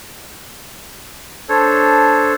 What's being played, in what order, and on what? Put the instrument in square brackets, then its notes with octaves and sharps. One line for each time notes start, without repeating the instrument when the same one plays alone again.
[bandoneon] D4 A4 C5 C#5